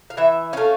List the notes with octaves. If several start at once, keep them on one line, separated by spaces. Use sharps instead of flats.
F5
E3 E5
A3 C#4 F5